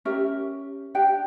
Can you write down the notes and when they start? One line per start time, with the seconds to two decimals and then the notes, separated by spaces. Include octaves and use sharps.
0.05 C#4 G4 A#4 E5
0.95 D4 G4 G5